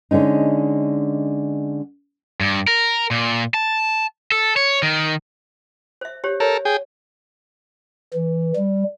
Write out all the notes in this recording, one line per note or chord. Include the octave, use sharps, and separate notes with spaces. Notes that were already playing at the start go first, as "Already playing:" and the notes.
D3 G#3 C#4 D#4
G2
A#4
A#2
A5
A4
C#5
D#3
C5 E5
G4 C5 C#5
A4 A#4 C#5
G#4 G5
E3
G3